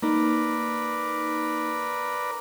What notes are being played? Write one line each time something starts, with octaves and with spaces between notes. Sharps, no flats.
A#3 D#4 A#4 B4 D5